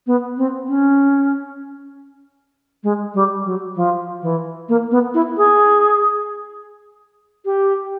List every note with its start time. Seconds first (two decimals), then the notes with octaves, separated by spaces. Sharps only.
0.07 B3
0.37 C4
0.68 C#4
2.84 G#3
3.14 G3
3.45 F#3
3.76 F3
4.22 E3
4.69 A#3
4.91 B3
5.14 E4
5.37 G#4
7.45 G4